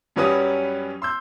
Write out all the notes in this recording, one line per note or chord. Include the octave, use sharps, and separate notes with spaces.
F#2 F#3 G3 C#4 B4 D#6
C6 E6 G6